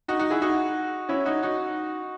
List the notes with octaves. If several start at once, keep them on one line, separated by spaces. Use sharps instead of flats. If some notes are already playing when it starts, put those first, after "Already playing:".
D#4 F#4
D#4 F#4
E4 G#4
D#4 F#4
C#4 E4
D#4 F#4
D#4 F#4